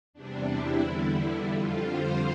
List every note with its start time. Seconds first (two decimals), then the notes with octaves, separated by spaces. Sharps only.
0.13 E2 C3 G3 D4
0.47 E4
0.80 E2 D3 G3
1.47 F2 D3 G3 F4
1.81 C5